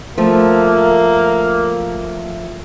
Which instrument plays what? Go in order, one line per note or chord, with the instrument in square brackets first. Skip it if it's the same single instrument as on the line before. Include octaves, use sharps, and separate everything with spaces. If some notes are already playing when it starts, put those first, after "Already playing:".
[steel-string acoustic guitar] F3 A3 [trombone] A#3